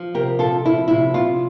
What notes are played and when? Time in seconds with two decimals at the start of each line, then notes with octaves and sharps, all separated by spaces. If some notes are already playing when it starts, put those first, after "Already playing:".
Already playing: F3
0.14 C3 G4 A#4
0.39 C4 F4 A4
0.65 F3 E4
0.88 C3 E4
1.14 C3 F4